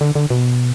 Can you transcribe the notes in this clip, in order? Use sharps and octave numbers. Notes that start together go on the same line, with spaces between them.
D3
D3
B2